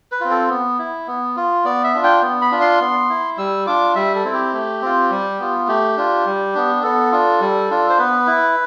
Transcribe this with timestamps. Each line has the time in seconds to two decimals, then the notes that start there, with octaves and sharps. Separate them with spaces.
0.12 B4
0.21 C4 F4
0.30 A4
0.49 B3
0.79 E4
1.07 B3
1.36 F4
1.65 B3 D5
1.84 E5
1.94 D4 F4
2.04 G5
2.22 B3
2.42 B5
2.51 D4 F4
2.61 C6
2.81 B3
3.09 E4
3.37 G3 E6
3.66 D4 F4 D6
3.95 G3 E5
4.15 A4
4.25 C4 E4
4.33 G4
4.53 A3
4.82 C4 F4
5.10 G3
5.39 B3 F4
5.68 A3 G4
5.97 D4 F4
6.26 G3
6.55 B3 D4
6.83 B3 A4
7.12 D4 F4
7.41 G3
7.70 D4 F4
7.89 C5
7.98 B3 B4
8.27 E4